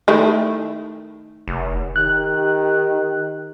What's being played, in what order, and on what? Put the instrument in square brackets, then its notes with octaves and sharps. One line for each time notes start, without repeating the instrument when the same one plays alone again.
[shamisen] D#3 A3 E4
[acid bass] F1
[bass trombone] D#3 [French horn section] G4 [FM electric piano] F#6